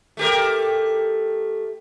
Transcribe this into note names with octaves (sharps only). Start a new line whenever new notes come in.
A3 G4 A#4